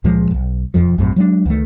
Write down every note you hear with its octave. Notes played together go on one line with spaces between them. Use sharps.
C#2 A#2 F3 G#3
D1 B1
E1 C2 F2 F3
A#1 F#2 A2 C3
F#3 G#3 C#4 D4
C#2 D#3 A3